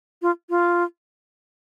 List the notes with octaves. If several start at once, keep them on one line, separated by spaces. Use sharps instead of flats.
F4
F4